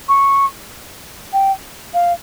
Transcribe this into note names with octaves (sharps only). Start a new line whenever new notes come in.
C#6
G5
F5